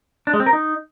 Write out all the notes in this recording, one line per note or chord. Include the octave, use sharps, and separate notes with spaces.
D4
G#3
C4
A#4
D#4